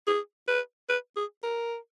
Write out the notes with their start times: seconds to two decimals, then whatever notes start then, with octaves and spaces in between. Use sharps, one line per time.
0.07 G#4
0.48 B4
0.89 B4
1.17 G#4
1.43 A#4